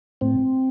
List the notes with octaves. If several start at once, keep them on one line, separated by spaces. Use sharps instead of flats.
A2 C4